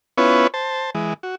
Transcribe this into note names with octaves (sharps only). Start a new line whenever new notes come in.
B3 C#4 E4 F4 B4 C#5
C5 A5
E3 G#3
F#4